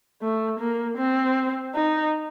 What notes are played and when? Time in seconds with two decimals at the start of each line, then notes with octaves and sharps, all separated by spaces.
0.22 A3
0.60 A#3
0.98 C4
1.75 D#4